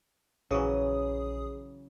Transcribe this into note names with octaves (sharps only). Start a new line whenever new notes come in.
A#1 C#3 E3 F#3 G#4 D#6